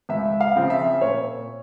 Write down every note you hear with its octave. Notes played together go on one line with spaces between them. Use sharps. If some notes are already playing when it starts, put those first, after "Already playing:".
C#2 E5
F5
C#3 F3 C4
E5
A#2 C#5